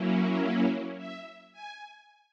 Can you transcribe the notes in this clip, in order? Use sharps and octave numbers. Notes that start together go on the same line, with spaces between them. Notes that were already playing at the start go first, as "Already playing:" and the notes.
Already playing: F#3 A#3 C#4 E4
E5
G#5